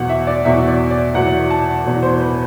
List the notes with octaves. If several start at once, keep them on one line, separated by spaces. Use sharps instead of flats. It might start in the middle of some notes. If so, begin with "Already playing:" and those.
Already playing: E2 B2 F#3 F#5
E5
D5
E2 B2 F#3 E5
D5
D5
E2 B2 F#3 F#5
A5
E2 B2 F#3
C5
B4